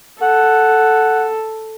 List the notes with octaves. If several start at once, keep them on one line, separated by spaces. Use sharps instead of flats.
A4 F#5